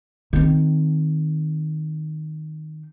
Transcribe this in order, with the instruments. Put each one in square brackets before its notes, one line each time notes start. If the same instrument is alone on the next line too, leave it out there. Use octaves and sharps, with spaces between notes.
[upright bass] D#3 C4